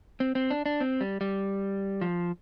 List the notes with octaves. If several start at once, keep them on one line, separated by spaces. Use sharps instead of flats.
C4
C4
D4
D4
C4
G3
G3
F3